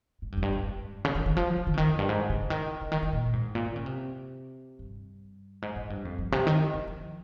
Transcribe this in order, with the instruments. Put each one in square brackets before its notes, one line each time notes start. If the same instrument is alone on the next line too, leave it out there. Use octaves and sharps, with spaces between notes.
[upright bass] G#2
G2
F2
G2
G#2
G#2
C#3
D#3
D#3
F3
C#3
D#3
C#3
D#3
F2
G2
G#2
C#3
D#3
C#3
D#3
D#3
A#2
G#2
A#2
D#3
C#3
C3
G2
G#2
G#2
G2
F2
G2
C3
D#3
D#3
F3